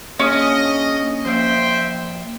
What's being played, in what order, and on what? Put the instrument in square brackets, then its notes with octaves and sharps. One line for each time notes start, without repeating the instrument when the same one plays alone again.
[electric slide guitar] A#3 D4 G#4 [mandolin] C#4 [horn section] D#5
[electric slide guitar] F3 A#3 [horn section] C5 E5 G5